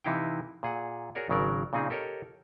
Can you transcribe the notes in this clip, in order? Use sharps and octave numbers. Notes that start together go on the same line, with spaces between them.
C3 E3 D#4 E4 F5 G5
A#2 G#4 F#5
F#4 G#4 A#4 C#5 D5
G#1 C#3 F#3 A#4 D5
A#2 C#3 C4 D#4 G#4
G4 A4 A#4 C#5 D#5